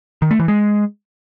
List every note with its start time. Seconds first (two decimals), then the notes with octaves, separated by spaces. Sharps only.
0.22 D#3
0.31 A3
0.39 E3
0.48 G#3